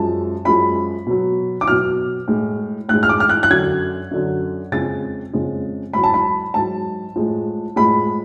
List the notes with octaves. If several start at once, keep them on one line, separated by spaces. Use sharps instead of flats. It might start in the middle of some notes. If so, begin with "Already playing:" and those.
Already playing: F#2 F3 G#3 A5
F#2 F3 G#3 B5
B2 F#3
D6
B2 F#3 F6
A2 G#3
A2 G#3 F#6
F6
D6
F6
F#6
F#6
F#2 D3 F#3 G#6
F#2 D3 F#3
F2 C#3 G#3 A6
F2 C#3 G#3
G#2 F#3 B5
A5
B5
G#2 F#3 A5
A2 F3 G#3
A2 F3 G#3 B5